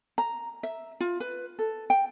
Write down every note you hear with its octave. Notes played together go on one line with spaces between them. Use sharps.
A#5
E5
F4
B4
A4
G5